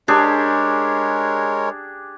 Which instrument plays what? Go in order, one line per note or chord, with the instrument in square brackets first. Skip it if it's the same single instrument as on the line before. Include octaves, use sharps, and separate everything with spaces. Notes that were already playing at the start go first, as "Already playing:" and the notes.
[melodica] G#3 A#4 C#5 [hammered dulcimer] D4 G4 G#4